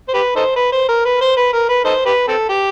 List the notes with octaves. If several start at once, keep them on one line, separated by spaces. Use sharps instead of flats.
C5
G4 B4
D#4 A4 C5
B4
C5
A#4
B4
C5
B4
A#4
B4
D#4 A4 C5
G4 B4
C4 A4
G4